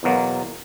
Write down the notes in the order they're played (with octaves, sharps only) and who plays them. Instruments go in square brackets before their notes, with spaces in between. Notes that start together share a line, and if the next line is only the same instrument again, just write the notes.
[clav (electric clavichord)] E2 B2 F#3 A#3